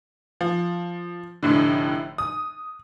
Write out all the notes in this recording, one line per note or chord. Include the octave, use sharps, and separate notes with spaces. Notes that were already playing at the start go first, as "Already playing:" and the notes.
F3
F1 A2 D3
D#6